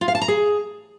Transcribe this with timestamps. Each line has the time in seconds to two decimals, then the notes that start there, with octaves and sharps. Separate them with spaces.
0.01 F4
0.08 F5
0.15 A5
0.21 A#5
0.28 G#4